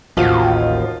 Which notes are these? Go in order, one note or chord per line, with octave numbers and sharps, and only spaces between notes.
A1 D#2 F3 F4 F#4